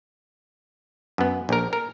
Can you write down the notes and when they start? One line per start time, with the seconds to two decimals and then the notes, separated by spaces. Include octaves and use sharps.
1.18 F#2 B3
1.49 A#1 A#4
1.73 A#4